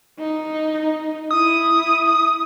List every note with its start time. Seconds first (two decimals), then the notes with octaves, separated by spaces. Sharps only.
0.19 D#4
1.31 E4 D#6